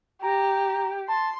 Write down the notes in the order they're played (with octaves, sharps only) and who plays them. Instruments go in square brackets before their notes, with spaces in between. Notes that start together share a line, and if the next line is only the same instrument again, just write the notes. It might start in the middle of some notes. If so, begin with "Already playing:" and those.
[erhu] G4 [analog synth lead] A#5
[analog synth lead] A5 [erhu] C6